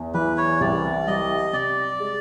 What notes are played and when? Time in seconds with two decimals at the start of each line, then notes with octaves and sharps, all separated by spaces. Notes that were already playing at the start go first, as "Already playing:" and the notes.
Already playing: E2
0.14 E3 B4
0.37 C#5
0.60 C2 D5
1.07 G3 D#5
1.53 C3 D5
2.00 G#3